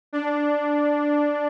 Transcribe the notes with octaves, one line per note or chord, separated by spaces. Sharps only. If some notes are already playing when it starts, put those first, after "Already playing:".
D4